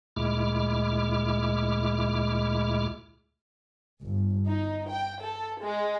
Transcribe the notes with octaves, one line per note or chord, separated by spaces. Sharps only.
D2 A#2 G#3 E4 D6 F6
G1
D#4
G5
A4
G#3